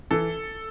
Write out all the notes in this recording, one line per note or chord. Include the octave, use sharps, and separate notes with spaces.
E3 A4